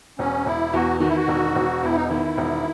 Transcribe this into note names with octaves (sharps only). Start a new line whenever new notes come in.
E1 C#4
E1 E4
E2 F#4
D#3 F#4
E4
F#4
E1
E1
E2 E4
D#4
D#3 E4
E1